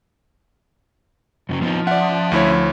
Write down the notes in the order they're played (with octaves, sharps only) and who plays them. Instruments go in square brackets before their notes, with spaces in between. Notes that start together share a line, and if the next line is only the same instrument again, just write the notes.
[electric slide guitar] F#2 C#3 F#3
[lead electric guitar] F3 [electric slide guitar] B3 C4 D#4
[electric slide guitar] C#4 E5 [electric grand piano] D5 F#5
[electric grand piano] D2 E4 C#5